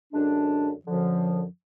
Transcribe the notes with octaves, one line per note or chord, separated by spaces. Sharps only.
F#2 D3 G#3 D4
F#2 D3 F3